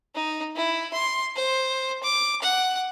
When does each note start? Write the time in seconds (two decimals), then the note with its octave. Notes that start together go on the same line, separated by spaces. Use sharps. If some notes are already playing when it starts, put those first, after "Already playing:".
0.15 D#4
0.56 E4
0.94 C6
1.36 C5
2.03 D6
2.42 F#5